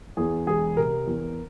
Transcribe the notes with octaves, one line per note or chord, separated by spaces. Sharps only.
E2 G#4
E1 G#4
C3 A#4
E2